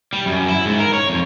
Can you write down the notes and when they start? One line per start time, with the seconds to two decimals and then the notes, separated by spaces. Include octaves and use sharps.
0.13 G3
0.26 F#2
0.49 E4
0.65 G#2
0.79 A#4
0.93 C#5
1.10 F2